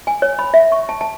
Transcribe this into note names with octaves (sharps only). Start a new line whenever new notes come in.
G#5
C#5
B5
E5
C#6
A5
A5